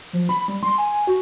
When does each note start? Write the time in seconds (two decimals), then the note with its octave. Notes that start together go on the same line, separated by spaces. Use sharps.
0.13 F3
0.29 B5
0.48 G3
0.63 C6
0.78 G#5
1.07 F#4